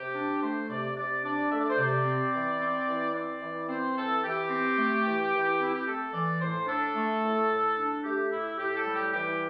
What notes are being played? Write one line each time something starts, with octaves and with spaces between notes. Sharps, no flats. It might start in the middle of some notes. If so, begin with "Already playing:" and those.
Already playing: C3 G4
D4
A3 C5
C3 D5
C3 D5
D4 D5
A3 E5
D5
C5
C3 D5
C4
E3
C4
E3
C4 D5
E3
C4 C5
E3 A4
E3 G4
C4
A3
E3
E3
C4 E4
G4
A3 A4
E3 D5
A2 C5
D4 A4
A3
A2
A2
D4
A3 G4
A2 E4
A2 G4
A4
G3
G4
E3 G4